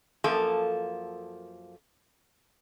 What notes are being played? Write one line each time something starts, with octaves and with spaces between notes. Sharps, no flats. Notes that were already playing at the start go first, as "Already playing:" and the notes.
F#2 F3 A#3 A4